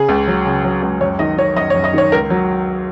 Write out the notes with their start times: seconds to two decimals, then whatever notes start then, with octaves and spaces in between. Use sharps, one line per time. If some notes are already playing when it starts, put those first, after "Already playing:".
Already playing: C#3 G#4
0.08 C#2
0.27 F#3
0.46 C#3
0.64 F#3
0.82 C#2
1.01 F#2 C#5
1.19 D#3 D#5
1.38 D#3 C#5
1.56 F#2 D#5
1.70 C#5
1.75 F#2
1.84 D#5
1.93 D#3 C#5
2.12 C#2 A#4
2.30 F#3